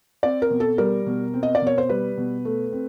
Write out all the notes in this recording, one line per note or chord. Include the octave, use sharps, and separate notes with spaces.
C4 D5
A#4
B2
A4
G3 A#4
B2
C4
D#5
D5
B2 C#5
C5
G3 B4
B2
A3
C4